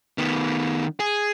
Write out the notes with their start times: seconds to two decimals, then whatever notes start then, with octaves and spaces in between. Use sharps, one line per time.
0.18 D#3 B3
1.00 G#4